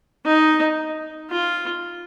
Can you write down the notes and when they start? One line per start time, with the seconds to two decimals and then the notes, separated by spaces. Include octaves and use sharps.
0.25 D#4
1.31 F4